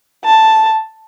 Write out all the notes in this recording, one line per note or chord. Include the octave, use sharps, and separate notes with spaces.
A5